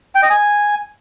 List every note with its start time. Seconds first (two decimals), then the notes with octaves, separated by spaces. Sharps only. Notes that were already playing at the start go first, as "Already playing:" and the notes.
0.15 G5
0.22 D#5
0.30 G#5